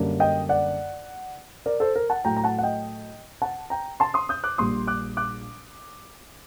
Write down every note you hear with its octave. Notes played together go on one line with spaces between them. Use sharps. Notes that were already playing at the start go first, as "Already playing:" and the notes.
Already playing: F#2 D3 G3 A#3 D4
D#5 G5
D5 F#5
A#4 D5
A4 C5
A#4
F#5 A5
A2 F#3 A3 G5 A#5
A#5
F#5 A5
F#5
D#5 G5
F#5 A5
G5 A#5
A5 C6
C6 D#6
D#6 G6
D6 F#6
A#1 A#2 G3 C6 D#6
D6 F#6
D6 F#6